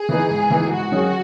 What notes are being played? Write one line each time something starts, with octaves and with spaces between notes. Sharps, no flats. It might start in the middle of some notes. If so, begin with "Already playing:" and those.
Already playing: G#4
E3 B3 D#4
G#2
E3 B3 D#4
G#2 F#4
D#3 F#3 C#4 G#4